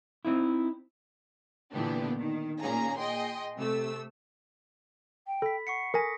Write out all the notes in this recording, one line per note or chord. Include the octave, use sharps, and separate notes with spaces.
C4 D#4 E4
A#2 D3 E3 B3 D4 G4
D#3
A#2 A#3 C#4 G#4 A#5
G#4 D#5 G5 C6
C3 A3 E6
G5
A4 B5 B6
F#5 C#6 C7 C#7
A4 A#4 G#5 D#6 A#6 B6